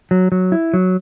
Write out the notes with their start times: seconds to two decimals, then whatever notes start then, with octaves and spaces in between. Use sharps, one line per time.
0.11 F#3
0.32 F#3
0.52 E4
0.74 F#3